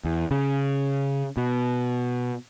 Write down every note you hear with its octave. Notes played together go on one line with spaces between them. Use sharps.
E2
C#3
B2